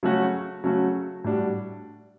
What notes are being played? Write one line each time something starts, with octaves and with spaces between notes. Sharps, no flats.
C#3 F#3 A3 C#4 F#4
C#3 F#3 A3 C#4 F#4
A2 G3 D4 F#4